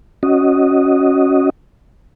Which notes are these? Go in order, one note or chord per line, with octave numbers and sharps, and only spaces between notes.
C#4 F#4 D#5